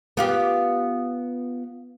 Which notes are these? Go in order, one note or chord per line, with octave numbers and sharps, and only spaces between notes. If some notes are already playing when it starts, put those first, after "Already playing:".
B3 F4 G4